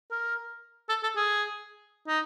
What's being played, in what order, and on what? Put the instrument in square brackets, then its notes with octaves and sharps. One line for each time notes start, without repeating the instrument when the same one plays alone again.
[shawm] A#4
A4
A4
G#4
D#4